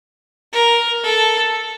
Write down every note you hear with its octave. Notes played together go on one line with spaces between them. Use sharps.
A#4
A4